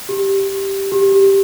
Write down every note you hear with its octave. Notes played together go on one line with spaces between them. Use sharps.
G4
G4
G4